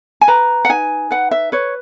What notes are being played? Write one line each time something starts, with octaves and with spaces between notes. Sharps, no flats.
G#5
B4 A#5
F#5
D#4 G#5
B4 F#5
E5
B4 C#5